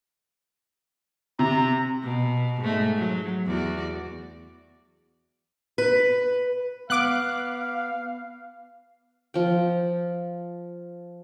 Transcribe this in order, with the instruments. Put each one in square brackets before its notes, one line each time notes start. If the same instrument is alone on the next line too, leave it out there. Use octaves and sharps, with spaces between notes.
[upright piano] C3 [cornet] A#5
[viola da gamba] B2
G#2 A3
F#3
E2 F#4 D5
[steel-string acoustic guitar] B4
[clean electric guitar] B3 [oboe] F5 [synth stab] D6 F#6
[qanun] F3 G5